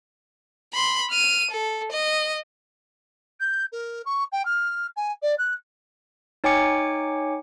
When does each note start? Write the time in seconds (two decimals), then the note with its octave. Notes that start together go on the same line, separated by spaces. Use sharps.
0.74 B5 C6
1.10 F6 D#7
1.51 A4
1.92 D#5
3.40 G6
3.72 A#4
4.05 C#6
4.32 G5
4.45 F6
4.96 G#5
5.22 D5
5.38 F#6
6.44 D#4 C#5 G5 G#5 D6 C#7